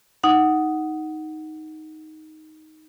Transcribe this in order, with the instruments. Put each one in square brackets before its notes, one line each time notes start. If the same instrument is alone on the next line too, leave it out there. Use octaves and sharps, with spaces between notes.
[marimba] D#4 F#5